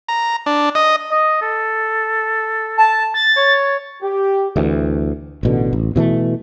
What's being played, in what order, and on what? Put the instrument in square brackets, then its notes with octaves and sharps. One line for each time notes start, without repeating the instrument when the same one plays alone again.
[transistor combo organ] A#5
D4
D#5
[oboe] D#5
A4
[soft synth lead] A5
A6
[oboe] C#5
[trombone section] G4
[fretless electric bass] D2 E3
A1 B2 D3
A1
B2 E3 G3 A3